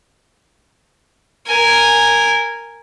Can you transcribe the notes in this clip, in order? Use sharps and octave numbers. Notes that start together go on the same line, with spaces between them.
A#4 G#5